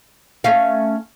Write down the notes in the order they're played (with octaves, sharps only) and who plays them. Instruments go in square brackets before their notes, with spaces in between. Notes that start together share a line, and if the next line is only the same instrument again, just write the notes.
[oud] A3 C#4 F5